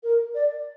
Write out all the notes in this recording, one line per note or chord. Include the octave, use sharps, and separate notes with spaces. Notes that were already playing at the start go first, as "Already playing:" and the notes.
A#4
D5